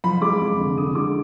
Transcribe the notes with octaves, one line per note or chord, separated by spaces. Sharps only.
F3 B5
G#3 D6
F2
D3
D3 D#6
G#3 D6